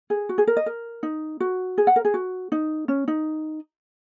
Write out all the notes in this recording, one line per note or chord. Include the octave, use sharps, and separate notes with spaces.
G#4
F#4
G#4
A#4
D#5
A#4
D#4
F#4
G#4
F#5
A#4
G#4
F#4
D#4
C#4
D#4